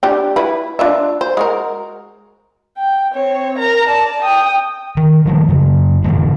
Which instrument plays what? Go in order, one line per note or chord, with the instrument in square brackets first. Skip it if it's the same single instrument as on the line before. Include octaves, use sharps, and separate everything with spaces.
[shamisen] D4 G4 G5
E4 B4
D4 F4 E5
C5
G#3 F#4 A#4
[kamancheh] G5
C4 C#5
A#4 A#5
D5 A5
G5 D#6
[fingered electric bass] D#3
D#3 F3 G#3
F#2 C#3
A2 D3 E3 G#3